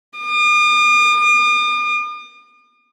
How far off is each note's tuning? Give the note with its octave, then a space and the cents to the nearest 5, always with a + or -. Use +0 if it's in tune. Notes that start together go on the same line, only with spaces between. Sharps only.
D#6 -45